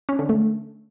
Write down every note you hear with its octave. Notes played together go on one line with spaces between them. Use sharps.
C#4
D3
A3